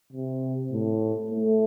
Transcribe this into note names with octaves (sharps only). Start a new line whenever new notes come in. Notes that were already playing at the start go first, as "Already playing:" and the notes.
C3
A2
A3